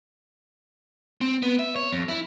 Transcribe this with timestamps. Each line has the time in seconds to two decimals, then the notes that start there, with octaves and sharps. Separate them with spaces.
1.21 C4
1.43 B3
1.59 E5
1.76 C#5
1.93 F2
2.09 E4